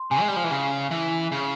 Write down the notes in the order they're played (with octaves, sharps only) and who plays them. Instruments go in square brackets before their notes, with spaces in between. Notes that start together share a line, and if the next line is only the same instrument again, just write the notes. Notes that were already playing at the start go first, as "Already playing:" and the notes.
Already playing: [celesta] C6
[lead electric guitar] C3 [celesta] G#5
[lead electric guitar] G#3
G3
F3
E3
C#3
E3
C#3